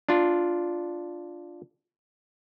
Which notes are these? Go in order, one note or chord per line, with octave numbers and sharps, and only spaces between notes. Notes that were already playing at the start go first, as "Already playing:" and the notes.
D4 F4